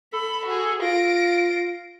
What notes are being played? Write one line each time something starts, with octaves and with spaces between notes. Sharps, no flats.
A4 B5
F#4 G#4
F4 A#6 D7